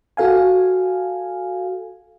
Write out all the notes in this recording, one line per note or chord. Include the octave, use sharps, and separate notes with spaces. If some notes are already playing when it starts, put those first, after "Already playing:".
F#4 A4 F5 G#5